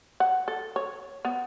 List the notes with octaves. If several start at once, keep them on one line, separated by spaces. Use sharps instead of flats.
F#5
A4
C#5
B3